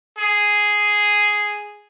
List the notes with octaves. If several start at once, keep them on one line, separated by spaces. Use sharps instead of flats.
G#4